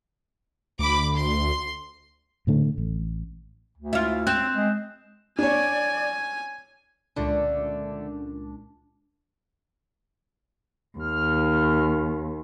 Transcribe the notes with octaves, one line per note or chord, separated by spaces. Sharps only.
D2 B5 D6
C6
A2 D3 A3
A1
D2
E4 F4
C4 F#6 G6 E7
G#3
D4 C#5 D5 G#5
C#2 A#2 D3 A3 D4
D#2 F6